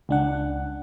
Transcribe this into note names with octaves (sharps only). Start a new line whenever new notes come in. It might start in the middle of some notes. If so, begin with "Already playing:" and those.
C#2 D4 F#5